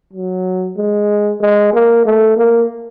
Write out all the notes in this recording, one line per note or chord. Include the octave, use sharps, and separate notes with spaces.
F#3
G#3
G#3
A#3
A3
A#3